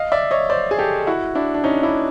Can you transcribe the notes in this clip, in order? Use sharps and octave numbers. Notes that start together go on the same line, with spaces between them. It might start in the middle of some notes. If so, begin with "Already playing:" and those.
Already playing: D#5 F5
D5 E5
C#5 D#5
C5 D5
G#4
G4 A4
E4 F#4
D4 E4
D4
C#4 D#4
D4 E4